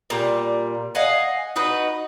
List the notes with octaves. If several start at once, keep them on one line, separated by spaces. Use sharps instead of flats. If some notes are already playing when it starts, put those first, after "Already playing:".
A#2 G3
D#5 F5 F#5 G#5
D#4 F#4 B4